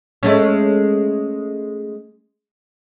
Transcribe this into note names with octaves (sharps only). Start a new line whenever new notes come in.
G#3 A3 C#4